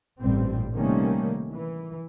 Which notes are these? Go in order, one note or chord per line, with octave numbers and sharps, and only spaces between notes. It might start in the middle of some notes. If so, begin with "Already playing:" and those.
A1 G2 A#2 G3 C4
C3 D#3 G3 A3 A#3 C#4
E3